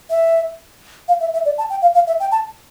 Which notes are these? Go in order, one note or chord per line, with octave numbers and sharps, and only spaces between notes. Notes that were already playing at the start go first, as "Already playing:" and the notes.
E5
F5
E5
E5
D5
A5
G5
F5
F5
E5
G5
A5